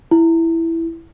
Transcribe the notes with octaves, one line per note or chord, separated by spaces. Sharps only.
E4